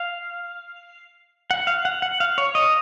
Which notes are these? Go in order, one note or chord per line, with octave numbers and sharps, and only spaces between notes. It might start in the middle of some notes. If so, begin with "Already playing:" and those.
Already playing: F5
F#5
F5
F#5
F#5
F5
C#5
D#5